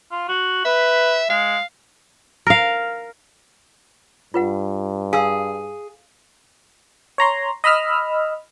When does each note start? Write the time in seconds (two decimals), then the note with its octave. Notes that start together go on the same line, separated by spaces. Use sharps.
0.12 F4
0.28 F#4
0.65 B4 E5
1.30 G#3 F5
2.47 A#4 F5
4.34 G2 F4 B4 F#5
5.13 G#4 F5 E6
7.18 C#5 A#5 C6
7.64 D#5 B5 E6 F6